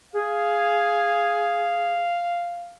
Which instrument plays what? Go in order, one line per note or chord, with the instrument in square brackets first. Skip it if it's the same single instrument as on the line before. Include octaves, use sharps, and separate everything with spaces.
[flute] G#4 [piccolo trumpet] F5